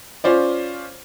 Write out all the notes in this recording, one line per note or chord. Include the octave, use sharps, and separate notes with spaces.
C#4 F4 C5 D5